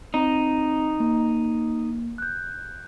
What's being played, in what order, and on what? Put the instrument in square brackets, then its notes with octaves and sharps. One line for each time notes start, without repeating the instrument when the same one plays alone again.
[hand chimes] C4 [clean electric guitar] D#4
[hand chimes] A#3
F#6 G6